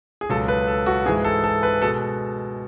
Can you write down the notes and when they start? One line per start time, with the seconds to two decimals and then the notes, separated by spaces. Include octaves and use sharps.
0.21 G#4
0.30 C#2 B2 F#3 A4
0.48 B4
0.67 A4
0.86 F#4
1.06 G#2 E3 G#3 G#4
1.25 A4
1.44 A4
1.63 B4
1.82 B2 G#3 A4